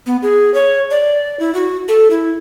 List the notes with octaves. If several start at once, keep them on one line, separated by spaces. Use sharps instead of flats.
B3
G#4
C#5
D5
E4
F#4
A4
E4